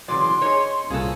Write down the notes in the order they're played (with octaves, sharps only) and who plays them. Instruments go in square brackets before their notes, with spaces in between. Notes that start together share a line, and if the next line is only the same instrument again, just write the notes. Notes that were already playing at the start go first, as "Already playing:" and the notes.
[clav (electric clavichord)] C#3 E3 F#3 [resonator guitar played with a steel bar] G#3 D5 [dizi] C6
[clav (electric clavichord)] D#4 G#4 [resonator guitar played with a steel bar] C#5
[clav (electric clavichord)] C2 A#2 C#3 [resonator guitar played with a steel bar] G#4 A4 [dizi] F5